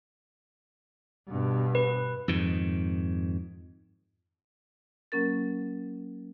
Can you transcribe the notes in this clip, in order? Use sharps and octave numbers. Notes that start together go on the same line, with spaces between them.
G2 B2
B4
F2 G#2 D#3
F#3 A#3 C#4 A#4 A6